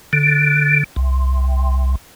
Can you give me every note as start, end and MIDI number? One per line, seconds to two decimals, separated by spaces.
0.13 0.83 50
0.96 1.95 36